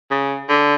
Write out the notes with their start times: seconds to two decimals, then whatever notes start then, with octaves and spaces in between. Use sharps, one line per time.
0.11 C#3
0.49 D3